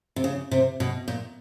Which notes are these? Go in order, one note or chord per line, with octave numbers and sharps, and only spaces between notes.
C3
C#3
C3
B2
A#2